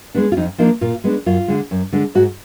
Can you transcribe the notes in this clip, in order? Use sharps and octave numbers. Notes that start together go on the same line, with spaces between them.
G#3 B3 D4
F4
F2 D#4
F3 A#3 D4 D#4
A#2 F4
G#3 B3 D4
F#2 F4
D3 G#3
F#2
D3 G#3 D4
G#2 F#4